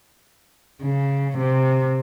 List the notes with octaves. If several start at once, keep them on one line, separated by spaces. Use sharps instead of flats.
C#3
C3